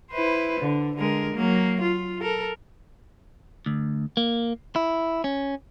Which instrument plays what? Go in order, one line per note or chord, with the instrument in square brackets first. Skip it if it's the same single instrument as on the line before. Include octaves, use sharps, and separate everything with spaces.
[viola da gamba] E4 B4 C5
D3
D3 G#3 A#4
F#3 A#3
F4
A4 A#4
[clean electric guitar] D2
A#3
E4
C#4